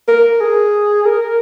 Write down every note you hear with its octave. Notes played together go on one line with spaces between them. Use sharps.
A#4
G#4
A#4